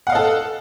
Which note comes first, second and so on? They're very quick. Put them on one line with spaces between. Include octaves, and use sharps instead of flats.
F#5 F5 D#5 A4